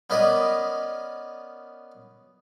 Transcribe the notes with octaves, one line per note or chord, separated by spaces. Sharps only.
B3 C#4 A#4 B4 D5 D#5